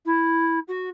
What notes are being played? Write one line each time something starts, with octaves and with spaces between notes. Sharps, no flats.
E4
F#4